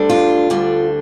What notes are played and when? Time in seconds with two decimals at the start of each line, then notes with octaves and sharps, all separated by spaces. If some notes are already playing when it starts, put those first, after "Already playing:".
Already playing: D2 D3 G3 D4
0.09 F4
0.50 D2 D3 G3 D4